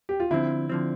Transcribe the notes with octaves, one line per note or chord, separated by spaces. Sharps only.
G4
F4
D3 F3 C4 E4
D3 F3 C4